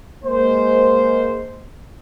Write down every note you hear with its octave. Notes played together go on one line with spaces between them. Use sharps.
G#3 A#3 C5